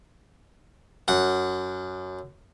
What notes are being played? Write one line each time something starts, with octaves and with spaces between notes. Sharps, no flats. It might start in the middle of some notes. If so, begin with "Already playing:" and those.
F#2 F#5